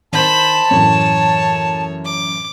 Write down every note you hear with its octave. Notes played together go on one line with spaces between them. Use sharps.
D#3 C5 A5 B5 G6 E7
F#2 A2 E3 C#5
D6